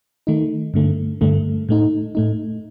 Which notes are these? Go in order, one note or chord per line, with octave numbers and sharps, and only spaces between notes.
D#3 A3 D#4
G2 D3 A3
G2 D3 A3
A2 A3 D#4
A2 A3 D#4